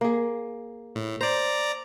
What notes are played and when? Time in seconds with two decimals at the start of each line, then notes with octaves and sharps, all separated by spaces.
0.01 A#3 G#4
0.96 A2
1.21 C5 D5 A#5